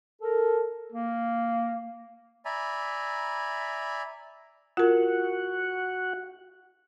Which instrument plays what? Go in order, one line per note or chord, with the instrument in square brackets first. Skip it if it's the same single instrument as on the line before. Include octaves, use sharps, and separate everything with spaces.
[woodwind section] A4 A#4
[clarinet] A#3
[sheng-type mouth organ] D5 E5 G#5 A#5 B5
[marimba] F4 A#4 [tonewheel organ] F#4 F#5